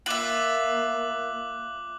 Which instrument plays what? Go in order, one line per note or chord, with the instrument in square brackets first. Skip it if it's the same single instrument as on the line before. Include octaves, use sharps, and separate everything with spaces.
[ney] A#3 [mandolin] F4 E5 [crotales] D6 F#6 F#7